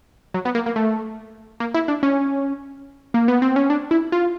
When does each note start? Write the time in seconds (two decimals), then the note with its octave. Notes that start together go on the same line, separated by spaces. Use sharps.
0.34 F#3
0.45 B3
0.55 A#3
0.66 A#3
0.76 A3
1.60 A#3
1.74 E4
1.88 D4
2.03 C#4
3.14 A#3
3.28 B3
3.42 C4
3.56 C#4
3.70 D4
3.91 E4
4.12 F4